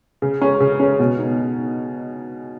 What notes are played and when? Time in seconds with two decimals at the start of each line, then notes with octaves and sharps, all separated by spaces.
0.22 C#3
0.42 G#3 C#4
0.60 C#3
0.80 G#3 C#4
0.99 B2
1.18 D#4